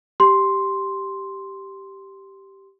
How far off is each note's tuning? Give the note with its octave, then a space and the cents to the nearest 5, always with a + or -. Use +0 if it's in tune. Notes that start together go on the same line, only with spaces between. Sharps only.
G4 -5 C6 +0